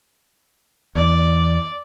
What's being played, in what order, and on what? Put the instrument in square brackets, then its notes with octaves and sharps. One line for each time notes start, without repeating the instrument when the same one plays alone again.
[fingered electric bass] E2 [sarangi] D5